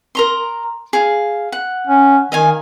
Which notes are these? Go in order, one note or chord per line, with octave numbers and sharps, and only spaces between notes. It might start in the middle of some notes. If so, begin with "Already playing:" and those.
A#4 A#5 C6
G#4 F5
F#5
C#4
D#3 D#5 F5 G#5